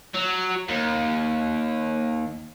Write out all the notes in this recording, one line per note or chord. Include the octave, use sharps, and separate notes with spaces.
F#3
D#2